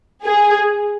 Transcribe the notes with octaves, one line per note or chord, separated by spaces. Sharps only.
G#4